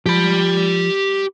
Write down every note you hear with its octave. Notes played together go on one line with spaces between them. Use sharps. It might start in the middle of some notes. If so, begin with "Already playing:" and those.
F3 G4 B5